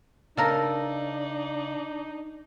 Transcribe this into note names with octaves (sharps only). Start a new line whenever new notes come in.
C#3 D4 D#4 A4 A#4 A#5